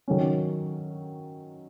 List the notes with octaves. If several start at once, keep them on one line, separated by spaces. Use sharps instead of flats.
D#3 F#3 C#4